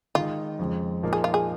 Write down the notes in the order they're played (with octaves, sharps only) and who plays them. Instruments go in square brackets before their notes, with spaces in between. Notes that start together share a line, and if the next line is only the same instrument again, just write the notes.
[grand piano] D#3 G#3 D#4 [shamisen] F4
[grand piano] F2 C#3 F3 G#3
A#2 F3 A#3 D#4
[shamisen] G#4
F4
G#4